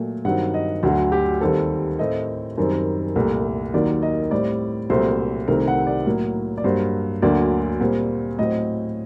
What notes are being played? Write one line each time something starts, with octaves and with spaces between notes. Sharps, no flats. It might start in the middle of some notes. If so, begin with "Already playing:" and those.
Already playing: A#2 F#3 A3
G2 D#3 F#3 C4 F#5
D#5
D2 D3 F#3 F#4
G4
D#2 D#3 G3 C4 A4
A2 A3 C4 D#5
F#2 D#3 G3 C4
C2 A#2 A3
D#2 D#3 F#3 A#3 D5
D#5
A2 G3 C4 D5
C2 A#2 F#3 A3 C4 C5
C2 C3 D#3 A3 C4 A#4
F#5
D5
A2 F#3 A#3
D5
G2 F#3 A#3 C5
D2 D3 F#3 A#3 D5
A#2 G3 C4
A2 F#3 C4 D#5